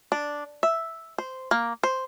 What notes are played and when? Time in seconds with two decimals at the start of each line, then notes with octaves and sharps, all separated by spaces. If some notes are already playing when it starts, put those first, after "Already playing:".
0.12 D4
0.63 E5
1.18 C5
1.51 A#3
1.83 C5